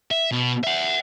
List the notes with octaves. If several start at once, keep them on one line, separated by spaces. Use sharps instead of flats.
E5
B2
E5 F#5